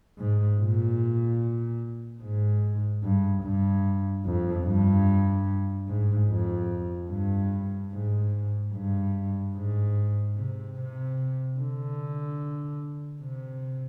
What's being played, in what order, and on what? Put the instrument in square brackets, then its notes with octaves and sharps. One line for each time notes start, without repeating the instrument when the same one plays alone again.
[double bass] G#2
A#2
G#2
G2
G2
F2
G2
G#2
F2
G2
G#2
G2
G#2
C3
C3
D3
C3